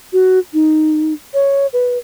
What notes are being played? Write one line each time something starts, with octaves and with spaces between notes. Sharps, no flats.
F#4
D#4
C#5
B4